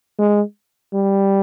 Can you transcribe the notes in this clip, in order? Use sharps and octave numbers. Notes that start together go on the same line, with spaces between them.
G#3
G3